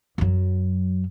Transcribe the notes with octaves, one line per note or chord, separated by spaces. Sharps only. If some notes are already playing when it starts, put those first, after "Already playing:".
F#2 F#3